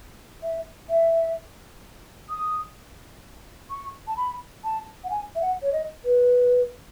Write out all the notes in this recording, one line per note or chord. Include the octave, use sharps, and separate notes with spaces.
E5
E5
D#6
C#6
A5
B5
A5
F#5
G#5
E5
F#5
C#5
D#5
B4